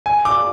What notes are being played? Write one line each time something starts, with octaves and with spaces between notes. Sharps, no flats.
G#5
D6